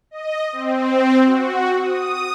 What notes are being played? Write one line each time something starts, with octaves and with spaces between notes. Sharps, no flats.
D#5
C4
F#4
D#6